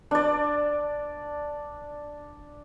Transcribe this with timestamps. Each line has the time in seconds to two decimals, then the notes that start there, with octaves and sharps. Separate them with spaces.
0.11 D4 D5